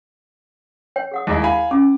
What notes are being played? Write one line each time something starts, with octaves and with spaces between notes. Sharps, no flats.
C#5 G5
G#4 F#5 D#6
D#2 G#3 E4
E4 F5 G#5 B5
C#4 F4 D6